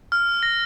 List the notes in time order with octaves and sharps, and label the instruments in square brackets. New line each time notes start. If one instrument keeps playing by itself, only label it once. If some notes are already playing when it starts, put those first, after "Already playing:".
[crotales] F6
A#6